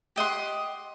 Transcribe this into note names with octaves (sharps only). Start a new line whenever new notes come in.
G4 D#5 F#5 C6